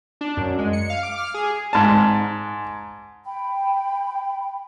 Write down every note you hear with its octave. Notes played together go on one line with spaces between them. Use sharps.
D4
F#2
G#3
C#7
F5
D6
F6
G#4
G#2 A5
G5 B5